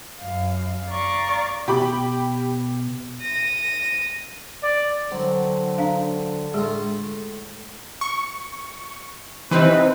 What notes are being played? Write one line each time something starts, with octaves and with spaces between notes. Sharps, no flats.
F#2 F5
D5 F5 A#5 C#6 D6
B2 G4 B5 D6
A#6 D#7
D5
D3 F#3 C4
D4 F5
A2 G#3 F4 G#4
C#6
C3 E3 C4 D#4 B4